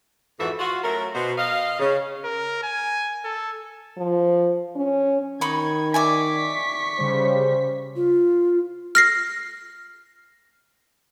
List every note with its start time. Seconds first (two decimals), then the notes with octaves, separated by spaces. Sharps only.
0.39 F2 G#2 E3 F#4 A4 E5
0.59 F4 F#4
0.83 F#3 A3 C#4 A#4
1.13 B2 B3 C5
1.38 D#5 F5
1.80 C#3
2.24 A#4
2.63 G#5
3.24 A4
3.97 F3
4.76 C#4
5.41 D#3 D#4 B5 C#6 G#6
5.94 D5 E5 G#5 C#6 B6
6.99 C#3 G3 C5
7.96 F4
8.95 F6 A#6 C7